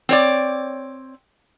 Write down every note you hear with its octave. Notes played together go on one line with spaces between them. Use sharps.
C4 C#5 D5